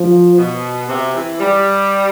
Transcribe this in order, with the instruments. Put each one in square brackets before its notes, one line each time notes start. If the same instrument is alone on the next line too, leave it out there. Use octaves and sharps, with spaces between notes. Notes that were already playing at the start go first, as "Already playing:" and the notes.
Already playing: [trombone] F3
[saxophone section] B2
C3
E3
G3